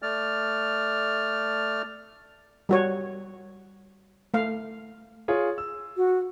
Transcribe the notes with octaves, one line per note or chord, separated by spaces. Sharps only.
A3 D5 F6
G3 F#4 C#5
A3 F5
F4 G#4 C#5
E6
F#4